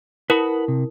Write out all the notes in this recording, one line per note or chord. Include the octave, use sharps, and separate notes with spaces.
E4 A#4 B4 F#5 B5
C3